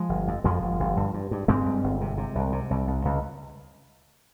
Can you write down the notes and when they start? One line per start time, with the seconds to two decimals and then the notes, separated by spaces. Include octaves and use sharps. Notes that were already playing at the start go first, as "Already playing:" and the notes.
Already playing: F3 G#3
0.09 G1
0.28 F2
0.44 F2 F3 G#3
0.62 G1
0.80 G1
0.97 G2
1.14 G2
1.31 G2
1.48 G2 G#3 C4
1.66 G2
1.84 G1
2.01 C3
2.18 C3
2.35 C2
2.52 C3
2.71 C2
2.87 C2
3.05 C#2